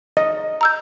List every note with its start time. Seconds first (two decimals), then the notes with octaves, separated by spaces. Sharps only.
0.17 D#5
0.61 A#5 E6 G6